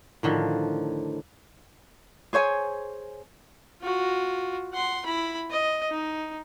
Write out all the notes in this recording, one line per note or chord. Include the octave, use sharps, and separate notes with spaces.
A2 D3 D#3 F3
G#4 C5 C#5 G#5
F4 F#4
F#5 C6
E4 B5
D#5
D#4